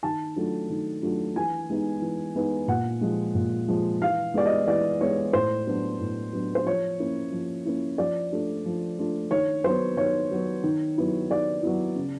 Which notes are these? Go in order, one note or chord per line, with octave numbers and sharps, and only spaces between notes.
D#3 A5
F#3 A3 D4 F4
D#3
F#3 A3 D4 F4
E3 G#5
G#3 B3 D#4
E3
G#3 B3 D#4
A#2 F#5
F3 G#3
A#2
F3 G#3
E3 F5
G#3 B3 D5
D#5
E3 D5
G#3 B3 C#5
A2 C5
F#3 B3 D4
A2
F#3 B3 D4
C5
F3 C#5
A#3 C#4 E4
F3
A#3 C#4 E4
F3 D5
A3 D4 F4
F3
A3 D4 F4
D#3 C#5
F#3 C5
B3
D#3 C#5
F#3 B3
D#3
F#3 B3 E4
D#3 D5
F#3 B3 E4
C#3